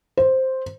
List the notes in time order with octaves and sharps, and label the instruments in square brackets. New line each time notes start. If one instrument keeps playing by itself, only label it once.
[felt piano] C5